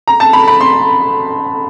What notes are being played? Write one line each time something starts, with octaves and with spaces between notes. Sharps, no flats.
A#5
A5
B5
B5
C6